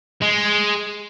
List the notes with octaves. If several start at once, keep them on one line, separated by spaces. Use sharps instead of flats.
G#3